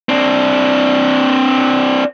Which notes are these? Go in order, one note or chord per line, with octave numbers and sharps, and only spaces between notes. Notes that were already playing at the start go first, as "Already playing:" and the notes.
C4 D4